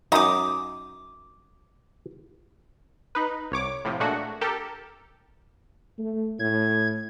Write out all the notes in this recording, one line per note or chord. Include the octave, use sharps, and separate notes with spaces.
F#2 D#4 D6 D#6
D#4 B4
C2 C#5 D6
A2 C3 F3
A#2 G#3 A3 D4 F#4
G4 A4 A#4
A3
A2 G#6